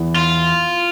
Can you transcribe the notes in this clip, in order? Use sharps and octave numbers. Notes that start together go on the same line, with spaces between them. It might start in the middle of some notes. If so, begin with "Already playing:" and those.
Already playing: E2
F4